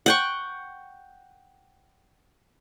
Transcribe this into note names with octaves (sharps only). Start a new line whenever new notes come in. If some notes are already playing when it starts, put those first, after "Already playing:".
F#5 G5 C#6